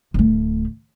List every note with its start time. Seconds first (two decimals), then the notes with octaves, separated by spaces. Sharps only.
0.14 D1 A3